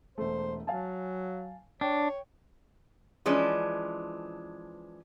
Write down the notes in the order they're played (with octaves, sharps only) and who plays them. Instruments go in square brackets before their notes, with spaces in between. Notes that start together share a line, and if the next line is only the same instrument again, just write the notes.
[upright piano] E1 A3 [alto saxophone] C5
[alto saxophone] F#3 [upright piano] F5 G#5 A5
[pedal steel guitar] D4 [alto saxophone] C#5 [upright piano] G5
[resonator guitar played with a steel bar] E3 F3 G#3 C#4 D4